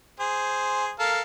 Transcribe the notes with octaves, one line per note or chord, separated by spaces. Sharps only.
G#4 C5
A4 A#4 F5